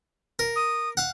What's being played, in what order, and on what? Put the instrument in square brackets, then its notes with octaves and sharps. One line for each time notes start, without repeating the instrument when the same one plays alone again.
[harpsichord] A#4
[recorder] D#6
[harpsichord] F5 F#5